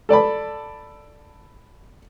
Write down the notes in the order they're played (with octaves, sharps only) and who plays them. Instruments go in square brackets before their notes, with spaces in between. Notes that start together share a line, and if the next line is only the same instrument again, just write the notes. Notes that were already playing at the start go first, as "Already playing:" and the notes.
[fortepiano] A4 D5 A5 B5